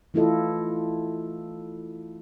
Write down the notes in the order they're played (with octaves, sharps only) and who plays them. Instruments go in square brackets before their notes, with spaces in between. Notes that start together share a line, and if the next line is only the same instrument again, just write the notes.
[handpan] E3 A3 E4 F4 A4 D#5